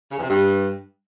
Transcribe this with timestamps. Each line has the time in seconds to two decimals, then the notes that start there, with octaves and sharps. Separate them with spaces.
0.12 C#3
0.17 E2
0.23 C3
0.29 G2